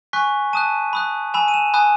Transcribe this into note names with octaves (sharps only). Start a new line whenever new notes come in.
G#5 C#6 F#6 B6
A5 D#6 F#6 D#7
B5 D#6 F#6
G#5 B5 E6 E7
D#7
E7
G#5 B5 D#6 F#6